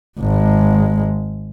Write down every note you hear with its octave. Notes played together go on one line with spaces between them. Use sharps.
G#1 G#3